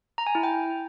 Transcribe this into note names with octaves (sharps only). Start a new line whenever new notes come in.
A#5
G#5
E4
G5